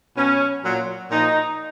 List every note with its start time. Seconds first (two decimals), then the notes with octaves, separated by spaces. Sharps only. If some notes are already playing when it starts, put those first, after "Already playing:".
0.17 B2 F#3 C#4
0.63 A#2 F#3
1.10 A#2 F3 D#4